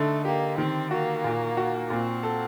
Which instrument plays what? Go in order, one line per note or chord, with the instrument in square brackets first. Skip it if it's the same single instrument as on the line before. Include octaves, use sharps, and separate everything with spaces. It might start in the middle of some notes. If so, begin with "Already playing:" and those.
Already playing: [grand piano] D3 D#4 [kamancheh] A3
[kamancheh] A#3 [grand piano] G4
[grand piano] D#3 [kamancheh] C4
[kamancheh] A#3 [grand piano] F#4
[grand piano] A#2
F#4
[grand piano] A#2 [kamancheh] C4
[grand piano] A4